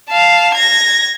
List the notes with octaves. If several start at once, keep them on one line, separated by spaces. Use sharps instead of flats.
F5 A5
G#6 A#6